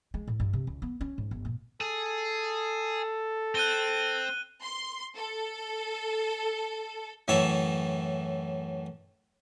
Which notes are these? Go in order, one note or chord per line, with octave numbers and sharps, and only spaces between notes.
G#3
A2
G2
C3
C#2
B3
C#4
G#2
G1
A#2
G#4 A4
C4 F#6 D#7 G7
C6
A4
F#2 A2 E3 C#5 E5 A5